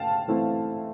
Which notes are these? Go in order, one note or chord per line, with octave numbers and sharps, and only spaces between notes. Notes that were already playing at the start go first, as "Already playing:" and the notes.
Already playing: A3 F5 G5 A5
E3 A3 C4 E4